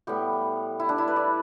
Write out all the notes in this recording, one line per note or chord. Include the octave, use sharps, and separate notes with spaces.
A2 G3 B3 G4
E4
D4
E4
B4
D5